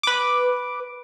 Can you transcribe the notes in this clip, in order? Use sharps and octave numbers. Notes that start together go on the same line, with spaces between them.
B4 D6